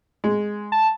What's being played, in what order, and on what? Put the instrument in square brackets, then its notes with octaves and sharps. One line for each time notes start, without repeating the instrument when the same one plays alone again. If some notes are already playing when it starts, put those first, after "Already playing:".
[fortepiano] G#3
[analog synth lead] A5